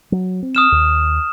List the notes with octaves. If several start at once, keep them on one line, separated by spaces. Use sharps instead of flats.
F#3
C4
D#6 F6 E7
D#2